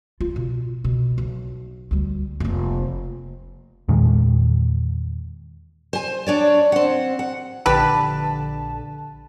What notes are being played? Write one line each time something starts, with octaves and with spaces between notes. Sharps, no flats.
F4
B2
B2
B1
D2 G3
F1 A#3
E2 A#2 D#3 G#3
C5 G#5
D4 C#5 D5
C4 F#5
F#5
A#1 D3 G4 B4 A5